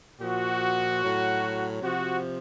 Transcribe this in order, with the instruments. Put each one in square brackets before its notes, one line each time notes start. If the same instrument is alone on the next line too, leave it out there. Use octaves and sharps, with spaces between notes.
[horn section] A#2 F3 F#4
A2 F#3
C3 F3 F#4